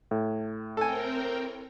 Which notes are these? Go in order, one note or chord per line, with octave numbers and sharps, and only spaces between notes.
A2
C4 A4 A#4 G5 G#5